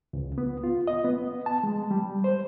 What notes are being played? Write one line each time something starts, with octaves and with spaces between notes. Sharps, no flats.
C#2
B3
F4
D#5
B3
A5
G#3
G3
C5